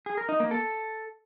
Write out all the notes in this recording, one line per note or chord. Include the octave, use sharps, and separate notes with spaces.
G#4
A#4
D#4
A#3
A4